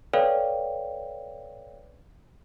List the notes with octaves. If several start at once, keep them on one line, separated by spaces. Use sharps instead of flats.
A4 B4 C#5 D5 F5 G5